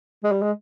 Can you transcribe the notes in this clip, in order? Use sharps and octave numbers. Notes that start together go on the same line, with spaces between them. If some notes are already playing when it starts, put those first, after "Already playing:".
G#3
G3
G#3